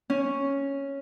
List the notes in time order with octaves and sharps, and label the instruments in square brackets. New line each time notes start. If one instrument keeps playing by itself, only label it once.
[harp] C#4